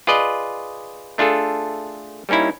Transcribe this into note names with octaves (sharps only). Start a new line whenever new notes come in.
F4 G#4 B4 D5 D#5
A3 D4 F4 G#4 A4
G3 A#3 C#4 D#4 E4